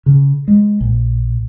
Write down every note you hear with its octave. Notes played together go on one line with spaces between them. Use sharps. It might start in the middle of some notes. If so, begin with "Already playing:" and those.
C#3
G#3
A#1